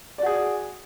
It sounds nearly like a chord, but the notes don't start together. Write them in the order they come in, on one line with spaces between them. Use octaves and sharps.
D5 F#4 G#4